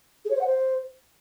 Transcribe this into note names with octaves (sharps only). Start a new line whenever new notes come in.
G#4
C#5
C5
F#5
C5